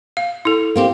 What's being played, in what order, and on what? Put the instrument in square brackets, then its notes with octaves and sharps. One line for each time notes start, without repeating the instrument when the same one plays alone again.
[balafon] F5
E4 A4
[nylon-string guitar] A#3 C4 G4